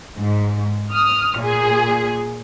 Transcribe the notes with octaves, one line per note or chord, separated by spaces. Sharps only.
G#2
D#6 F6
A#2 G#4